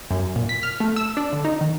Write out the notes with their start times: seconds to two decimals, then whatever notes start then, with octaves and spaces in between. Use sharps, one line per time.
0.11 F#2
0.36 A#2
0.49 B6
0.63 F6
0.80 A3
0.96 E6
1.17 D4
1.33 D3
1.45 D#4
1.61 D#3